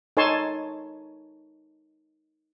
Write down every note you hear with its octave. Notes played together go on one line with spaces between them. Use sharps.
D#4 A4 C#5 G#5 A5 C6